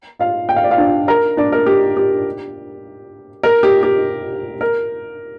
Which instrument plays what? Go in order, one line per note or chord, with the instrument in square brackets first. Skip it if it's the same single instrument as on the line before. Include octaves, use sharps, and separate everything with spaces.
[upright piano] F4 F5
G5
F5
D5
F4 F5
D4 D5
A#4 A#5
D4 D5
A#4
G4
G4
A#4
G4
G4
A#4